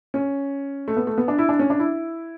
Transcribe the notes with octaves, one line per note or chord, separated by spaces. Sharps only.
C#4
A3
B3
A3
B3
D4
E4
D4
C#4
D4
E4